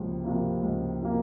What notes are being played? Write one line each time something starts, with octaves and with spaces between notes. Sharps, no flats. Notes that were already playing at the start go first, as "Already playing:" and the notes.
Already playing: C#2 C3 F3 A#3
C3 F3 A#3
C#2
C3 F3 A#3